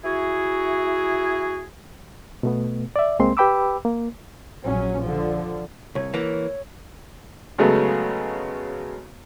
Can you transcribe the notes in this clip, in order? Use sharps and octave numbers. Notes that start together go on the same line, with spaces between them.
E4 F#4 G#4
B2 A3 B3
D5 E5
C2 G#3 A#3 C4 C6
G4 B4 G5 B5 D6 E6
A#3
A#1 F#3 C#4
D3 F3
C2 C#5
E3 A#3 E6
C#3 F#3 G#3 A3 B3